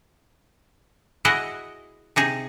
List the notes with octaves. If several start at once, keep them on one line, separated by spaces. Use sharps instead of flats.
E4 F#4 G#4 D#5 F#5
C3 D#4 G#4